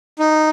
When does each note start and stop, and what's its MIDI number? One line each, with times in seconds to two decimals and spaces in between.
0.19 0.50 63